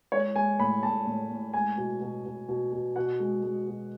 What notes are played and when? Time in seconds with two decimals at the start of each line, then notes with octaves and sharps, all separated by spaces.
0.12 G#3 C#5
0.36 G#3 G#5
0.59 A2 B5
0.83 A2 A5
1.06 A2
1.31 A2
1.54 G#3 G#5
1.77 B2
2.02 B2
2.26 B2
2.49 B2
2.73 B2
2.96 B2 F#5
3.20 G#3
3.43 G#3
3.68 B2